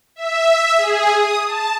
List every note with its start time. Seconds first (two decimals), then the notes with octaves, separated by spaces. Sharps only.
0.16 E5
0.78 G#4
1.13 D#6
1.47 A5